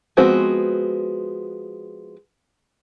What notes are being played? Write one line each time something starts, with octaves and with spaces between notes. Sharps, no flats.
F3 G#3 B3 C4 F#4